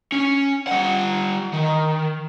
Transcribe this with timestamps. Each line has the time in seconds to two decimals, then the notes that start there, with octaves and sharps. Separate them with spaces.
0.12 C#4
0.67 G3 F#5
1.53 D#3